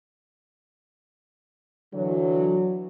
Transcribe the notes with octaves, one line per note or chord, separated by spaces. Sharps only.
D3 E3 F#3